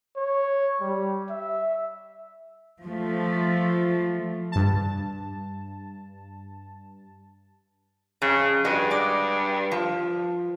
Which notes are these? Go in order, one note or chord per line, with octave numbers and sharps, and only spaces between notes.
C#5
G3
E5
F3 A3
G2 A5
F2 C#3
G2 F#4 G#4 D#5
G#3 D5
F3